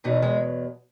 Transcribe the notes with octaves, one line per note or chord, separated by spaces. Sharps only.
E2 B2 F#3 D#4
G#3